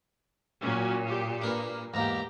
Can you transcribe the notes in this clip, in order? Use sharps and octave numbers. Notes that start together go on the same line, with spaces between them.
A#2 F#3 A#3 C#4
G4
A#3 D4 A#4 B4
E2 G#2 A#3 G4 A#5